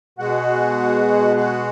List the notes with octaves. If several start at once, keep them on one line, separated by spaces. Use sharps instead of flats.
B2 G#3 F#4 F#5
F#4 F#5